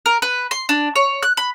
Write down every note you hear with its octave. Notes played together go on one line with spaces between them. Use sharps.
A#4
B4
C6
D4
C#5
F#6
B5